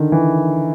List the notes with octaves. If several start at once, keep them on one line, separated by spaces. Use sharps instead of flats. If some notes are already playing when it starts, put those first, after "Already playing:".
Already playing: D3 D#3
E3